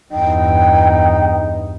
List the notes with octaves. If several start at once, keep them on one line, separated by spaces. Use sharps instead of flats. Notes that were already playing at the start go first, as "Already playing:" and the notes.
E2 G2 D#4 G5